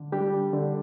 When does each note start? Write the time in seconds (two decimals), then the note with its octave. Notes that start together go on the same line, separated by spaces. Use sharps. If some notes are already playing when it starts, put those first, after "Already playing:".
Already playing: D3
0.12 G3 D4 G4
0.53 D3